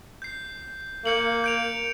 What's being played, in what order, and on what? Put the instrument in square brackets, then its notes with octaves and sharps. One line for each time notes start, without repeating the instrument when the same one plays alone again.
[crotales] G6 C7
[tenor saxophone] A#3 [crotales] G6 C#7 F#7
[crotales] G6 D7 F7